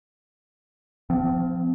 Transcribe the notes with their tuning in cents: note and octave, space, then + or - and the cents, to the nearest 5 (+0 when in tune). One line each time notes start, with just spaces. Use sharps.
F3 +0 C4 -35